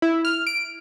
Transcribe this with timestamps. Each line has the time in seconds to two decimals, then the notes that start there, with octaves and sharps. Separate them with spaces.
0.02 E4
0.25 F6
0.47 D7